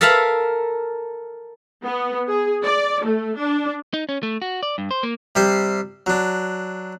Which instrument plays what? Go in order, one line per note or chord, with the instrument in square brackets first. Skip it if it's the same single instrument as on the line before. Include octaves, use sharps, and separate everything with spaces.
[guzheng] A4 A#4 E5 F5 A5 B5
[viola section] B3
G#4
D5
A3
D4
[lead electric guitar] D#4
C#4
A3
F#4
D5
G2
C5
A#3
[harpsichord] C3 G3 C5 C6
F#3 D4